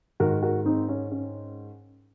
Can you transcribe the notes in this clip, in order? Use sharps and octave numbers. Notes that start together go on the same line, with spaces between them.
G#2 D#3 F#4 A#4
F#4 A#4
C4 D#4
C#4
C#4